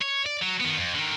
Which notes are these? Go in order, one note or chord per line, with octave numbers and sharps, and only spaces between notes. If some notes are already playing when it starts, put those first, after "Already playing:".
C#5
D5
F#3
D#3 B3
F2
D3 D#3